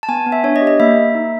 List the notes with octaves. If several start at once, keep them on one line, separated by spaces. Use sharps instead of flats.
A5
B3 G#5
B3
E5
D4 C#5
D#5
G4
D#5
A#3 E5
A#3
D#4